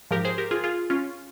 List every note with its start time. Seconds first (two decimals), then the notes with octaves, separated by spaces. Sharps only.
0.11 G#2 F3 G4 A#4
0.25 G#4 C5
0.38 G4 A#4
0.51 F4 G#4
0.64 F4 G#4
0.90 C#4 F4